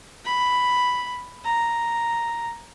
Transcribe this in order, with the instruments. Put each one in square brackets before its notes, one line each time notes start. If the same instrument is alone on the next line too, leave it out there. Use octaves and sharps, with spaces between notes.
[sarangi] B5
A#5